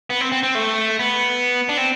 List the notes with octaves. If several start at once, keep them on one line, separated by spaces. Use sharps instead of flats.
B3
C4
C4
C4
A3
B3
D4
C4